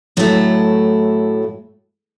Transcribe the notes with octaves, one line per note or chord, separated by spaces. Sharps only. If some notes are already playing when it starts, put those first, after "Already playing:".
A2 F#3 A3 E4